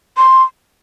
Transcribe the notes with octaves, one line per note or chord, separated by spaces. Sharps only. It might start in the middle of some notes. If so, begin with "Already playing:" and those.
C6